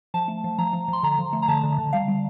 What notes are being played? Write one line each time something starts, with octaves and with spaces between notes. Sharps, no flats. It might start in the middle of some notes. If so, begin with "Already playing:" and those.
F3 A5
A3
F3
F3 A#5
F3
F3 C6
D3 A#5
F3
A3
A#5
D3 A5
D3
D3
G3 F5
G3